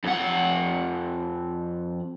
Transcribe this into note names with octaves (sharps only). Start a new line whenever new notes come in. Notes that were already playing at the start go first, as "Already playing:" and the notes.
F2 F#5